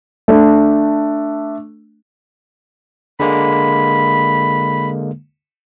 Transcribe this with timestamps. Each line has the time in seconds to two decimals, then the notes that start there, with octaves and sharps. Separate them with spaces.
0.28 A3 D4
3.20 D3 G#3 A#3 B5